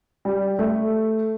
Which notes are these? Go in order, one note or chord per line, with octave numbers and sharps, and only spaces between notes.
G3
A3